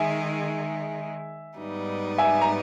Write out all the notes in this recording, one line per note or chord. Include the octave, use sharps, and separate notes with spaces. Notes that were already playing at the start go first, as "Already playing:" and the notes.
Already playing: D#3 G#3 D#4 G#4 E5 G#5
G#2 G3 B3 D#4
E5 G#5
A#5